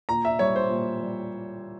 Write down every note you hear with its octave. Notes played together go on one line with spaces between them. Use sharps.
A#2 A#5
E5
G3 C#5
C5
A#2
G3